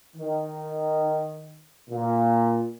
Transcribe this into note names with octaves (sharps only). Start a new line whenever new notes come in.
D#3
A#2